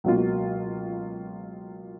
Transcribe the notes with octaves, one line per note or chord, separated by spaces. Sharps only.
C#2 B2 F#3 A#3 F4